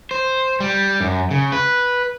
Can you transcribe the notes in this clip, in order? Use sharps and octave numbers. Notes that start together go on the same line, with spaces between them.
C5
G3
F#2
C#3
B4